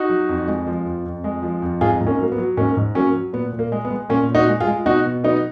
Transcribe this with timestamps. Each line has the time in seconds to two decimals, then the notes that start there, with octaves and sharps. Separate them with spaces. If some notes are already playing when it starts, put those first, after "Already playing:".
Already playing: D#4 F#4
0.09 F#3
0.29 F2
0.48 G#3
0.67 F3
0.86 F2
1.05 F2
1.24 G#3
1.42 F3
1.62 F2
1.81 G#2 F4 G#4
2.00 G#2
2.07 A#3 C#4
2.19 F#3 A#3
2.32 B3
2.38 F#3
2.57 G#2 A#3 C#4
2.77 G#2
2.95 F#3 A#3 C#4
3.14 F#3
3.33 A#2 B3
3.53 A#2
3.59 A#3
3.72 G#3
3.85 B3
3.91 G#3
4.09 A#2 A#3 C#4
4.29 A#2
4.35 D#4 F#4
4.48 G#3
4.60 F4 G#4
4.67 G#3
4.86 B2 D#4 F#4
5.05 B2
5.23 F#3 B3 D#4